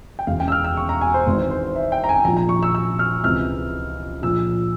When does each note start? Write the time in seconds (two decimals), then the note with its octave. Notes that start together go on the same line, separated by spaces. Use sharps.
0.19 G5
0.27 E1 E2 C#3 F5
0.40 G5
0.48 E6
0.52 F6
0.64 E6
0.77 C#6
0.89 A#5
1.01 G#5
1.14 C5
1.27 G#1 G#2 E3
1.51 C5
1.76 E5
1.92 G5
2.04 A#5
2.09 G#5
2.24 A#1 A#2 A#5
2.37 A#5
2.49 C#6
2.63 E6
2.74 E6
2.99 F6
3.23 C#2 C3 E3 F6
4.22 A#1 A#2 E6